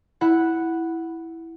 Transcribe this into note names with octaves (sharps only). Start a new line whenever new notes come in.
E4 F#5 B5